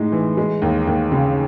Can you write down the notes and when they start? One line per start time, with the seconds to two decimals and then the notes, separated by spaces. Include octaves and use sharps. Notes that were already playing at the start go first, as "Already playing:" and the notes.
Already playing: A2 G#3 D#4
0.12 E3
0.37 G#3
0.62 D#2
0.87 D#2
1.12 C#3